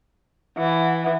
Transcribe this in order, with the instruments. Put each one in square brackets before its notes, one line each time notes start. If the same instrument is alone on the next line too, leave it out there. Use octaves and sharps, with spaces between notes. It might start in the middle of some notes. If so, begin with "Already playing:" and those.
[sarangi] E3 [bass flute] F#5